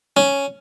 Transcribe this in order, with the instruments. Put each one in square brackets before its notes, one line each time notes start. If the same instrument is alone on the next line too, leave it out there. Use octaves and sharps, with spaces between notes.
[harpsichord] C#4